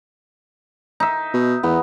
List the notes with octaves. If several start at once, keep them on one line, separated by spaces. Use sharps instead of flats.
D#4 E5
B2
E2 B3